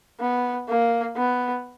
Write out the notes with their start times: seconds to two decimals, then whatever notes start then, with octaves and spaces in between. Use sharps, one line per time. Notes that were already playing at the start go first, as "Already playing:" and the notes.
0.20 B3
0.69 A#3
1.17 B3